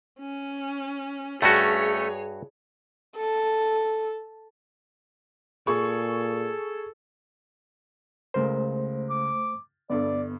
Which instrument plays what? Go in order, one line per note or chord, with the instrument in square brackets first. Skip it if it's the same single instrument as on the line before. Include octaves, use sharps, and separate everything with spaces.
[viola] C#4
[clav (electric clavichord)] G2 F#4 [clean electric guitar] A3 C#4 [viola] G#4 C#5
[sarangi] A4
[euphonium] A#2 [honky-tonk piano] G#4 C#6 [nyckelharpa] A4
[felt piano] C#2 C#3 A#4 [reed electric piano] A3 C5
[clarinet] D6
[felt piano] G1 G2 A4 [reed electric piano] B3 [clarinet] D5